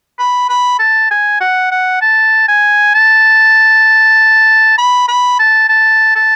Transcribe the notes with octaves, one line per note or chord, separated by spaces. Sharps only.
B5
B5
A5
G#5
F#5
F#5
A5
G#5
A5
B5
B5
A5
A5
A5